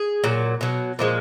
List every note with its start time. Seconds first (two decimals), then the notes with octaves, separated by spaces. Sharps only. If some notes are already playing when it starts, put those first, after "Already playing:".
Already playing: G#4
0.24 A#2 F#3
0.61 B2 F#3
0.99 A#2 F3 G#3